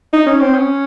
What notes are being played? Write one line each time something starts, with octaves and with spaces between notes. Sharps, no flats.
D#4
C#4
C4
C#4